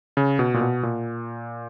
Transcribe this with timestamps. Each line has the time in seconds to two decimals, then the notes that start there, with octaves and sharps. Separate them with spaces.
0.17 C#3
0.39 B2
0.54 A#2
0.61 B2
0.83 A#2